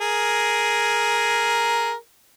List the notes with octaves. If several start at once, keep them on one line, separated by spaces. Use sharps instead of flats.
G#4 A#4